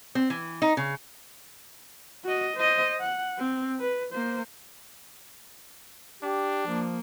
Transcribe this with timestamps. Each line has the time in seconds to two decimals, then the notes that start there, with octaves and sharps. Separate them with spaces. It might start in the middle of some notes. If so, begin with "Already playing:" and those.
0.15 C4
0.30 E3
0.62 D#4
0.77 C#3
2.24 F#4 D#5
2.57 C5 D#5
3.01 F#5
3.39 C4
3.80 B4
4.13 A#3 C5
6.22 D4 G4
6.67 F3 A#3